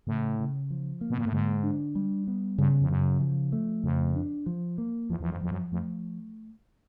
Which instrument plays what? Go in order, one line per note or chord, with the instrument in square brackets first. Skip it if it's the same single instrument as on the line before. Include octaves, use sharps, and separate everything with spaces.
[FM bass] A2 [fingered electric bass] C#3
[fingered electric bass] C#3
F3
A#3
[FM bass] B2
A#2
A2
[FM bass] G#2 [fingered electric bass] D3
[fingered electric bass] D4
G3
B3
[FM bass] G2 [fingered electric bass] C#3
[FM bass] F2
[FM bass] F#2 [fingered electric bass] C#3
[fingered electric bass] F3
A3
[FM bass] F2 [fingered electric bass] C#3
[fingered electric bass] D4
F3
A#3
[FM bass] E2 [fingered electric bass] F3
[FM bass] E2
F2
[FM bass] F2 [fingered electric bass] F3
[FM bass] F#2
[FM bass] F2 [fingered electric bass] A3